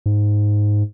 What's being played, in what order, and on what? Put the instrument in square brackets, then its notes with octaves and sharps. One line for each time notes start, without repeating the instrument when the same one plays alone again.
[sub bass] G#2